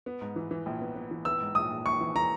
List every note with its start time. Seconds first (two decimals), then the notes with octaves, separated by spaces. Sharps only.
0.06 B3
0.21 G#2
0.36 E3
0.51 E3
0.66 A#1
0.81 B3
0.96 B3
1.11 E3
1.25 B3 E6
1.41 G#2
1.55 A#1 D#6
1.70 A#1
1.86 A#1 C#6
2.01 E3
2.15 E3 A#5